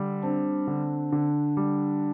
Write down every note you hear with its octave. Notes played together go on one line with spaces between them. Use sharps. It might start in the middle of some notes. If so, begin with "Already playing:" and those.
Already playing: D3 G3
C4 D4
D3
D3
G3